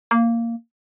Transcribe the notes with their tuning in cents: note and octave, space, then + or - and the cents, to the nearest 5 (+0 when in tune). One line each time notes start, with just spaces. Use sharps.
A#3 -10